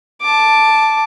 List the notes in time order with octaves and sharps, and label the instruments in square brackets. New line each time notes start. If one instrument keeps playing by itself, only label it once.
[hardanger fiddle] A5 D6